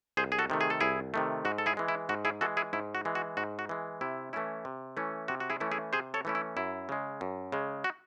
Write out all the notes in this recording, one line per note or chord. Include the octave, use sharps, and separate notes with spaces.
C2 G#4 C5
G#4
F#4 A4
C3 D#3 A3
G#4
A4
C2 E4 G#4
C3 D#3 A3
G#2 F#4
A4
E4 G#4
E3 G#3
E4
G#2 F#4
E4 G#4
E3 G#3 F#4 A4
E4 G#4
G#2 E4
F#4
E3 G#3
F#4
G#2 F#4
F#4
E3 G#3
C3 E4
E3 A3 C#4 E4
C3
E3 A3 C#4 E4
C3 F#4
F#4
E4 G#4
E3 A3 C#4 E4
E4 G#4
C3 G#4 C5
A4 C#5
E3 A3 C#4 E4
E4
F#2 E4
C#3 G#3
F#2
C#3 G#3
F#4